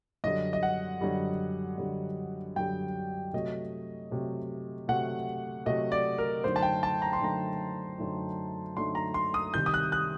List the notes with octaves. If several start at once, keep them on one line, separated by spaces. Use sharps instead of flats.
F#2 D3 G3 D#5
D#5
F#5
F#2 D3 G3
F#2 D3 G3
F#2 D3 G3 G5
C3 F#3 A3 D#5
C3 F#3 A3
C3 F#3 A3 F#5
C3 F#3 A3 D#5
D5
A#4
F#2 D3 A3 D#4 C5
A5
G5
A5
A#5
C6
F#2 D3 A3 D#4 A#5
F#2 D3 A3 D#4
F#2 D3 A3 D#4 C6
A#5
C6
D#6
C3 D#3 G3 G6
D#6
F#6
F#6